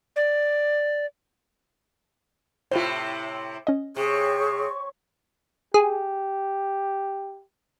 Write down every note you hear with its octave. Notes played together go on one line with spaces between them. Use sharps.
D5
A2 C3 E4 F4 C5
C#4 D#5
C3 G#4 C#5 C#6
G4 G#4